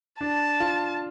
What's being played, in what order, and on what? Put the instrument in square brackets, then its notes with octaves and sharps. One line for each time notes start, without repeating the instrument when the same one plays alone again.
[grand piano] D4 [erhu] A5
[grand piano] F4